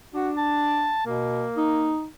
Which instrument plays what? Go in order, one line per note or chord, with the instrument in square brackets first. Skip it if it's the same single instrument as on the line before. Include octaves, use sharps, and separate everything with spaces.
[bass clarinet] D4 [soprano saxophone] F#4
[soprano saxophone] A5
[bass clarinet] B2 [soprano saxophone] A#3
[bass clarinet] D#4